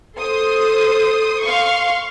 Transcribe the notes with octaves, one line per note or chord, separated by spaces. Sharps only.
A4 C5 C6 D#6
F5 C6 C#6